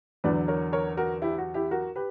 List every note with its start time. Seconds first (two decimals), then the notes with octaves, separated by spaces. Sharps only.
0.24 E2 D3 F#3 B4 D5
0.48 A#4 C#5
0.73 A#4 C#5
0.97 F#4 A#4
1.22 E4 G4
1.38 F#4
1.54 E4 G4
1.71 F#4 A#4
1.96 G4 B4